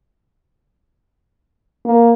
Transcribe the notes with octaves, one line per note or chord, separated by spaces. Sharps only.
A#3